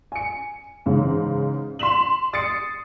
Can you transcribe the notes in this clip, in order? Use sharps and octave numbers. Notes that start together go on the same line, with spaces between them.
G#5 C#7
G#2 C#3 E3
C6 B6 E7 F#7
D#6 A6 C7 C#7